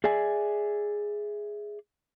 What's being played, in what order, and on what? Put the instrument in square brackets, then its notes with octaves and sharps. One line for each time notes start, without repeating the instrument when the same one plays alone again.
[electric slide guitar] G#4 D5 E5 G#5